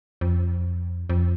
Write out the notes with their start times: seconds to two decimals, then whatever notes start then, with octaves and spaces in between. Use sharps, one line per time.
0.21 F2
1.10 F2